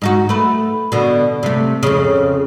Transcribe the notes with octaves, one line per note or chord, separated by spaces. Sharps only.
G#2 D#4 F#4
A3 B4
B2 D3
C3 A3
F2 C#3